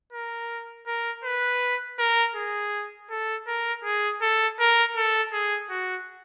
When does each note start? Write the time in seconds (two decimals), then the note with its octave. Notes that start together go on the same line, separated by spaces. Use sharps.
0.13 A#4
0.86 A#4
1.24 B4
1.99 A#4
2.35 G#4
3.10 A4
3.47 A#4
3.84 G#4
4.22 A4
4.59 A#4
4.96 A4
5.32 G#4
5.70 F#4